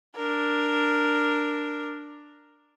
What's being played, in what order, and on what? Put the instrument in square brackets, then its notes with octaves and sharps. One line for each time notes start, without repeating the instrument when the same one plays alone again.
[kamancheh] D4 A#4